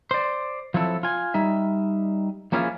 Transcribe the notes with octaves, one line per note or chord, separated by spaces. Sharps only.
C5 D5
F3 F#3 C4 E4 A4
F4 G#5
G3 D#4 E5
F3 A#3 C#4 E4 F4 G#4